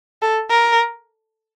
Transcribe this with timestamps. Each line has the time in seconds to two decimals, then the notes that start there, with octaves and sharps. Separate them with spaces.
0.22 A4
0.50 A#4